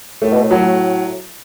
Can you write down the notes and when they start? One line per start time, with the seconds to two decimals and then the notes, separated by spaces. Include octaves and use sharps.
0.22 A2 A3
0.32 B2
0.42 A2
0.51 F#3